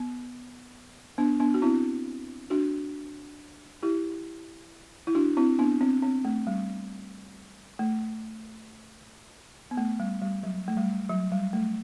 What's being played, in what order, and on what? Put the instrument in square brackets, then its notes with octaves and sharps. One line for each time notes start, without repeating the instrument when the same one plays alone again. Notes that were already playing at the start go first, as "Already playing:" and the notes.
Already playing: [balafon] B3
B3 D4
B3 D4
F#4
C4 E4
D4 F#4
E4 G4
E4
D4 F#4
C4 E4
B3 D4
C4
C4
A3
G3
A3
B3
A3
G3
G3
F#3
A3
G3
F#3
G3
A3